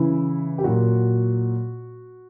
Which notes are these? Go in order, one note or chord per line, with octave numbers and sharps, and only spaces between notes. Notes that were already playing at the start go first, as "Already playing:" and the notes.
Already playing: C#3 E3 E4
G4
A#2 F#3 F#4